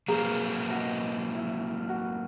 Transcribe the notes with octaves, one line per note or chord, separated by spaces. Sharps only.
F#3 A#3 C4 G#4 F5 A#5
F#4 D#5 A5
E4
F#4